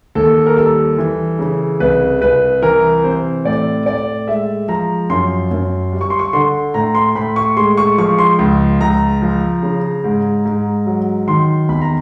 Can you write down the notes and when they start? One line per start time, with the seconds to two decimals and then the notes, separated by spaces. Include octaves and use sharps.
0.15 D#2 A4
0.46 A#4
0.56 G3 A4
0.98 E3
1.39 C#3
1.80 C2 B4
2.21 C2 B4
2.62 E3 A#4
3.04 C3 C5
3.45 A2 D5
3.86 A2 D5
4.28 G#3 E5
4.68 F3 A#5
5.10 F#2 C6
5.51 F#2
5.92 G3
6.01 C#6
6.10 C6
6.19 C#6
6.33 D3 C6
6.74 A2 A#5
6.95 C6
7.15 A2 B5
7.36 C#6
7.57 G#3 C6
7.77 C#6
7.98 F3 C#6
8.19 C6
8.39 C#2
8.80 C#2 A#5
9.22 F3
9.63 C#3
10.04 G#2
10.45 G#2
10.86 F#3
11.27 D#3 C6
11.69 E2 B5
11.81 A#5